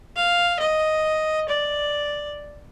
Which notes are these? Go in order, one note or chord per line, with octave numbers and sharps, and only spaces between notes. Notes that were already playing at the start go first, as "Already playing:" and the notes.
F5
D#5
D5